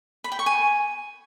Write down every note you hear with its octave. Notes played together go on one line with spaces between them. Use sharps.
B5
G5
C#6
G#5